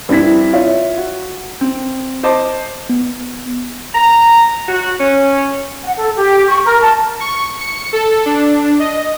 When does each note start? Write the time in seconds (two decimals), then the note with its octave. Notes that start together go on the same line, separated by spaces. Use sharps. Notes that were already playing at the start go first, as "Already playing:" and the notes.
0.09 G2 C4 E4 B6
0.53 F4 C#5 E5
0.98 F#4
1.61 C4
2.23 C5 D#5 A5 D6
2.89 B3
3.95 A#5
4.68 F#4
5.00 C#4
5.83 F#5
5.95 A4
6.16 G4
6.47 C#6
6.64 A#4
6.80 A5
7.20 C#6
7.59 C#7
7.93 A4
8.26 D4
8.79 D#5